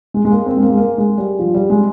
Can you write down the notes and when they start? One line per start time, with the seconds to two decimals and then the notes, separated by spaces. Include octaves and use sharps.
0.14 G#3
0.25 G#3
0.31 A#3
0.46 C4
0.57 G#3
0.62 A#3
0.70 G#3
0.77 A#3
0.98 G#3
1.18 G3
1.39 F3
1.54 G3
1.70 G#3